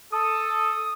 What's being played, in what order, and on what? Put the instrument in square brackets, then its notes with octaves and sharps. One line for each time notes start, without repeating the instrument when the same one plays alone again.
[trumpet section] A4 [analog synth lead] D#6